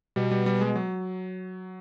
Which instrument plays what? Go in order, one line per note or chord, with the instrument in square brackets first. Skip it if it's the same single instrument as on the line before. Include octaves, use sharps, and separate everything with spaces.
[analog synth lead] B2 [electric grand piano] G3
[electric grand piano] G3
G3
G#3
F#3